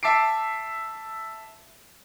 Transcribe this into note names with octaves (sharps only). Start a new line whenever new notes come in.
E5 A5 D6 C7 D7